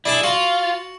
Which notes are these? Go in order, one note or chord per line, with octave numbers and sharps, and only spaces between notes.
D4 E4 G#4 A5
F4 F#4